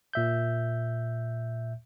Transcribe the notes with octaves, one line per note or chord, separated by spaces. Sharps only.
A#2 E5 G6